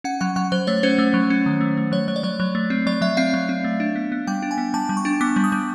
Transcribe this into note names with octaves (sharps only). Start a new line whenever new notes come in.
C#4 F#5
F#3 F#5
F#3 F#5
F#3 C5
A3 C#5
C#4 C5
A3
F#3
C#4
D#3
A3
A3
F#3 C#5
F#3 C#5
D5
F#3 C#5
F#3
A3
C4
F#3 D5
F#3 E5
C4 F5
F#3
C4
A3
D4
B3
B3
G3 G5
D4
G#5
B3
G3 A5
G3
C#6
D4
B3 D6
G3
D#6
G3